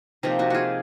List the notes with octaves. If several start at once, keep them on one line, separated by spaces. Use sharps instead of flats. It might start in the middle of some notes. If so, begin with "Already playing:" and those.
C3 F3 A#3 C4 D#4
D#4 F#4
F4 F#4 G#4